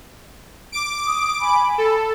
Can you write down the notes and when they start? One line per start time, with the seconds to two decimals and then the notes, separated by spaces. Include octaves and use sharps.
0.72 D6 D7
1.06 D#6
1.41 G#5 B5
1.78 A4